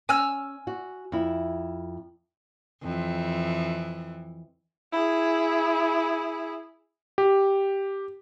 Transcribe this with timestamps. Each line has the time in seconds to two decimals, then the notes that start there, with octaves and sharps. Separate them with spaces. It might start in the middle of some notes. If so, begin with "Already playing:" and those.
0.09 C#4 G#5 E6 F6
0.67 F#4
1.12 F2 E4
2.83 F2 E3
4.92 E4 G#4
7.18 G4